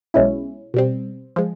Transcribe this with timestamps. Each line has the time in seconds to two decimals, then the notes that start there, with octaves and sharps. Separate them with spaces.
0.14 B1 B2 G#3 C#4 E4
0.74 B2 G3 C4
1.36 F3 G#3